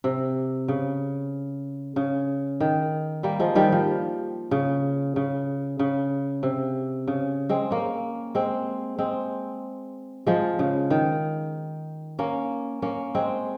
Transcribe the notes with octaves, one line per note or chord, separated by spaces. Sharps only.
C3
C#3
C#3
D#3
G3 A#3
F3 G#3
D#3 G3
F3
C#3
C#3
C#3
C3
C#3
G#3 C4
A#3 C#4
G#3 C4
G#3 C4
F3 G#3
C#3
D#3
A#3 C#4
A#3 C#4
G#3 C4